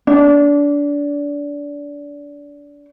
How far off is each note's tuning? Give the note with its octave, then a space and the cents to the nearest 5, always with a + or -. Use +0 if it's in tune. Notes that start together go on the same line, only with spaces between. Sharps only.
D4 -25